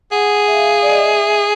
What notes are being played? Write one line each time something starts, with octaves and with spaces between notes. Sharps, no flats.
G#4 F#5
E5
F5
D5
D#5
E5